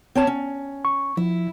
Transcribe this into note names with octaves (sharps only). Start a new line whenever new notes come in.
C4 C#5 A5
C#4
C#6
F3 E4